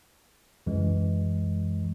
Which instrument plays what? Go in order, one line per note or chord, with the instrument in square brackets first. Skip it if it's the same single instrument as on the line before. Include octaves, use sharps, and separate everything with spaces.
[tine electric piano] C#2 F#2 E3 G#3